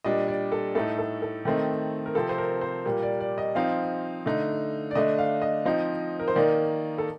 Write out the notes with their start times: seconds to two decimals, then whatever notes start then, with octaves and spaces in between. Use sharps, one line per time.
0.04 A#2 G3 D4 D#5
0.28 D5
0.52 A4
0.75 A2 A3 D#4 A4
0.98 A4
1.22 A4
1.45 D#3 A3 C4 D#4
2.06 A#4
2.15 C3 F3 C4 A4
2.29 C5
2.38 A#4
2.61 C5
2.85 A#2 G3 A#3
3.03 D5
3.20 D5
3.38 D#5
3.55 F3 C4 D#4 F5
4.26 D3 A3 D#4
4.91 D5
4.95 D3 A3 D4 D#5
5.18 F5
5.42 D#5
5.65 F3 C4 D#4
6.20 A#4
6.28 C5
6.35 D#3 A#3 D#4 D5
6.98 A4